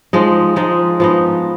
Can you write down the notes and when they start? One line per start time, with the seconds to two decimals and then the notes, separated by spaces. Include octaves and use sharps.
0.13 F3 G#3 D#4
0.56 F3 G#3 D#4
1.00 F3 B3 D#4